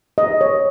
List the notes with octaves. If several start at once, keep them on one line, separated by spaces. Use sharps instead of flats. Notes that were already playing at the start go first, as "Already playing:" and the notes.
D#5
C#5